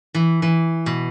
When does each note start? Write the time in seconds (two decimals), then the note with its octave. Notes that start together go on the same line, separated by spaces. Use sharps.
0.14 E3
0.42 E3
0.86 B2